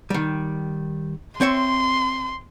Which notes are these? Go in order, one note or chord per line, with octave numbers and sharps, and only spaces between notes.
D#3 G3
C4 C#5 E5 C6